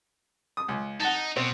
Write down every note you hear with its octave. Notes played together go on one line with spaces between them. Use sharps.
D#6
C#2
D#4 F#5 A5
B2 C4